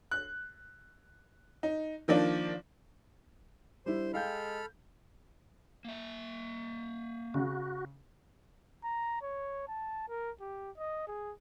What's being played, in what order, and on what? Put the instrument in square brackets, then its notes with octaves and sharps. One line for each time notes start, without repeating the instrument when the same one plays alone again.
[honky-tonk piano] F#6
D#4
D#3 F3 A#3 D4
[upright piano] G3 D4 E4 [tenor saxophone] C5
[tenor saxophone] G#3 [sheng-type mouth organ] A4 B5 F6 [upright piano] F5 G5 G6
[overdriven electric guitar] A#3 E5
[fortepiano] C#3 [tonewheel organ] F#4
[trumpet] A#5
C#5
A5
A#4
G4
D#5
G#4